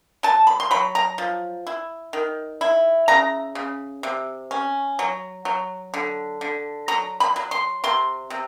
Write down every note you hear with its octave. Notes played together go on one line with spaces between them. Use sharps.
F#3 A5
B5
C6
F#3 B5
A#5
F3
E4
D#3
E4
C#3 A#5
C#3
C3
C#4
F#3
F#3
D3
D3
F#3 A#5
B5
F#3
C6
C3 C6
C3